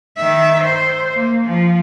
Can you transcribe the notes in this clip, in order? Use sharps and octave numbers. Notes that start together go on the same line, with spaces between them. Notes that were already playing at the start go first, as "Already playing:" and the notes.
D#3 E5
C5
A#3
F3